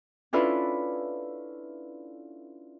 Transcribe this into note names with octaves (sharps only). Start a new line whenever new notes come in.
C#4 D4 E4 F4 A4 B4